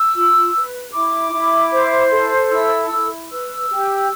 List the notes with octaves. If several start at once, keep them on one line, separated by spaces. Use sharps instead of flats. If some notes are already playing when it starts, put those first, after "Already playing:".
Already playing: E6
F4
B4
E4 D6
E4
C5
A4
E4 E6
E4
B4 E6
G4